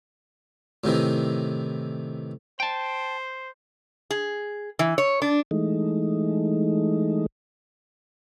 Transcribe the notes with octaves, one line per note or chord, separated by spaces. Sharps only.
A2 C3 D#3 E3
C5 G5 A5
G#4
E3
C#5
D4
E3 G#3 A3 D#4